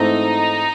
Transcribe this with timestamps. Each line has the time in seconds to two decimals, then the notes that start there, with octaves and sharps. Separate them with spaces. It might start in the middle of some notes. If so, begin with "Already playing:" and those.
Already playing: G#2 E3 A3 C4 D#4